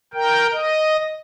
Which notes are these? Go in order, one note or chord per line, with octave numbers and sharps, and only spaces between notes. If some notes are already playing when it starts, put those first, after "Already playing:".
A#4 G5
D#5